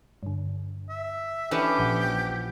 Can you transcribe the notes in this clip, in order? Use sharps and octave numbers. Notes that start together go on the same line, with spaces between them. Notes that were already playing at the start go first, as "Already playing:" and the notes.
G2 D3
E5
E3 C#4 D4 G4 A4 D#6 C#7
A#1 A#2 F3 F#5 G6